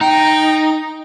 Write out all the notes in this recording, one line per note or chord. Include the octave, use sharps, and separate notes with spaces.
D#4 G5